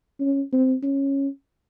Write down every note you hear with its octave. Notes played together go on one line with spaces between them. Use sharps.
C#4
C4
C#4